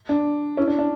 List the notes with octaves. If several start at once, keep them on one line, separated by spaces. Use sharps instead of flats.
D4
C#4 E4
D4
D4